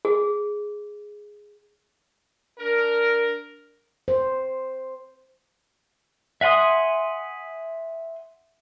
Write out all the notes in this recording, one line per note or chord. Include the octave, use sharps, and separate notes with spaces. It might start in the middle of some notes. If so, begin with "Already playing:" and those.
G#4
D4 A#4
C5
E5 F#5 G#5 C6 D#6